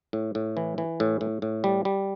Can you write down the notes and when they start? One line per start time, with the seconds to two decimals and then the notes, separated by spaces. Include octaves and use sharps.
0.13 A2
0.35 A2
0.57 E3
0.78 E3
1.00 A2
1.21 A2
1.42 A2
1.64 G3
1.85 G3